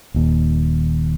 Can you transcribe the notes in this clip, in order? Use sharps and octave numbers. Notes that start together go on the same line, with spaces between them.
D#1 D#2